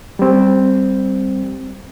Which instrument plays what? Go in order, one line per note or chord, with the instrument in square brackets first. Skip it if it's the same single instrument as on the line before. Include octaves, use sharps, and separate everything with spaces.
[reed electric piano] G3 C4